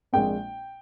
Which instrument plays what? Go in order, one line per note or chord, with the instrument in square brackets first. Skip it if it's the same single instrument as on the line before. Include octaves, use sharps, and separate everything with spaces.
[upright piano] A#1 A#2 G#3 C4 G5